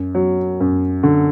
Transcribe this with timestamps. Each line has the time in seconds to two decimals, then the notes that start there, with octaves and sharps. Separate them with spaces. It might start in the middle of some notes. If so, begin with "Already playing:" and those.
Already playing: F#2
0.15 F#3
0.60 F#2
1.03 D3